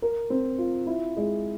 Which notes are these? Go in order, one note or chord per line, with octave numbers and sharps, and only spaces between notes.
A#4
C4
F4
E4
G#3